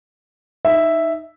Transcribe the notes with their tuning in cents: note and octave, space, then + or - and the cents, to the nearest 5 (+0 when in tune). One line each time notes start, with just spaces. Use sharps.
D#4 +0 E5 +0